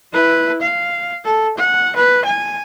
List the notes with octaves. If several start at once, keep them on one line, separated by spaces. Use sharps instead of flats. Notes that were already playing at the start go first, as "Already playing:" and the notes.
E4 B4
F5
A4
F#5
B4
G#5